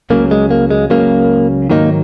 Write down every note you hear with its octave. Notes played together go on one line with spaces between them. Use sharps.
C#2 C#3 F#3 A#3
G#3
A#3
G#3
C#2 C#3 F#3 A#3
G#2 D#3 F#3 A#3 D#4